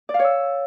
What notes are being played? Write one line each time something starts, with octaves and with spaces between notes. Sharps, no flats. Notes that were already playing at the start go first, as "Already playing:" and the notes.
D5
F5
C#5
E6